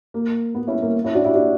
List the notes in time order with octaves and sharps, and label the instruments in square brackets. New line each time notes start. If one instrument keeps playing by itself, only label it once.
[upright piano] A#3
B3
C#4 E4
A#3
C#4 E4
D4 F#4
E4 G4
D4 F#4